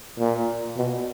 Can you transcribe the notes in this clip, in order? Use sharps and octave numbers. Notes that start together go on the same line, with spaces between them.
A#2
B2